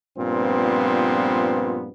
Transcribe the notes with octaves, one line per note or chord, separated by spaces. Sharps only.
G2 A#2 F3 B3 C4